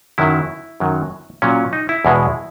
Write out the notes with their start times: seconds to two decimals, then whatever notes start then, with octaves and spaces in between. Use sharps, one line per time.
0.18 F#2 D#3 F#3 E4
0.80 F#2 D#3 F#3
1.42 A#2 F#3 C#4
1.73 D#4
1.89 E4
2.05 E2 B2 G#3